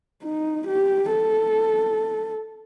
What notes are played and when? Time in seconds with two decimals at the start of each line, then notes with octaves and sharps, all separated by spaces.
0.24 D#4
0.68 G4
1.12 A4